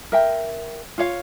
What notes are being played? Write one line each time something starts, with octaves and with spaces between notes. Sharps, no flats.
A#4 E5 G5
F4 C#5 F5